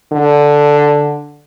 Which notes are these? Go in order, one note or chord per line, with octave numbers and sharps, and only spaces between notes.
D3